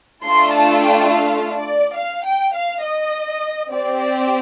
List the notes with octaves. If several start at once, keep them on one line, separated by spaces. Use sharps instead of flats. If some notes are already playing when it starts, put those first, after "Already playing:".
A3 D4 F4 A4 C6
A5
G5
F5
D5
F5
G5
F5
D#5
C4 G4 D5
D5